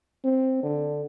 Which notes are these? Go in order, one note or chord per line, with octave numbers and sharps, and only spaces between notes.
C4
D3